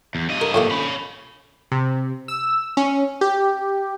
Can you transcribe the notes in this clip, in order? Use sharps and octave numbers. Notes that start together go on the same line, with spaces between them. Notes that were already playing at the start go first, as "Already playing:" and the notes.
E2
G2 D#5
A#4
A2 F3 A#3
C#4 B5
C3
E6
C#4
G4